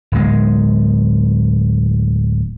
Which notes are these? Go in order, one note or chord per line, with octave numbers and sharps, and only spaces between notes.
D1 G#3